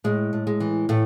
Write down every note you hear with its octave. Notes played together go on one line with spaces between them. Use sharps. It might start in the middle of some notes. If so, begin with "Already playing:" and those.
A2 G#3
A2
G#3
E3
A2 E3 A3